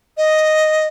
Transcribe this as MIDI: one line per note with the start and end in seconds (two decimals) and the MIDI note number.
0.18 0.87 75